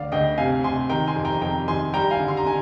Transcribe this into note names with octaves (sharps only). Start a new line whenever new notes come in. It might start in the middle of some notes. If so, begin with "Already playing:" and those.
Already playing: D2 D5 F5
D2 D#5 G5
C3 F5 G#5
C3 G#5 C6
D#3 G5 A#5
G#5 C6
F2
G5 A#5
F2 G5 A#5
D#3 G#5 C6
G3 G5 A#5
F5 G#5
D3
C6
A#5
D3 G#5